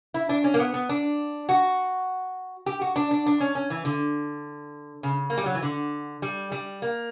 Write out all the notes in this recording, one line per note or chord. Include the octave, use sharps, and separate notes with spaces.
E4
D4
C#4
A#3
B3
B3
D4
F#4
G4
F#4
D4
D4
D4
C#4
C#4
E3
D3
C#3
A#3
G3
F#3
E3
D3
G3
G3
A#3